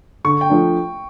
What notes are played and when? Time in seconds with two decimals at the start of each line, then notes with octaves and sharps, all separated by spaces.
0.24 D3 C#6
0.41 G5
0.49 F3 A3 D4